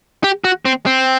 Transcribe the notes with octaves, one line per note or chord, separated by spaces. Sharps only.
G4
F#4
C4
C4